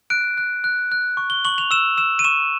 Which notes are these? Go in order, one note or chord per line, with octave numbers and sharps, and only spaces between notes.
F#6 D7
F#6
F#6
F#6
C#6
G7
C#6 F#7
F7
E6 E7
E6 E7
D#7
C#6 E7